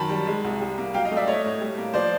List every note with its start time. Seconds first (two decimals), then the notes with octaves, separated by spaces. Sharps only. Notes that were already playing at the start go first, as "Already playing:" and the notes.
Already playing: F#2 D#3 A5 B5
0.10 G3
0.27 G#3
0.45 C2
0.61 G3
0.78 A#3
0.94 F#3 F5 G5
1.05 D#5 F5
1.11 A3
1.17 D5 E5
1.27 A3 C#5 D#5
1.44 A2
1.61 G3
1.78 A#3
1.94 F3 C5 D5